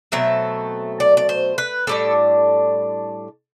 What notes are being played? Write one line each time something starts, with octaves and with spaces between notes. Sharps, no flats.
B2 F#3 A3 C4 E5
D5
D5
C5
B4
A2 G3 D4 A4